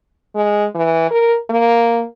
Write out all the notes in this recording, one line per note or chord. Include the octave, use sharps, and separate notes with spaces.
G#3
E3
A#4
A#3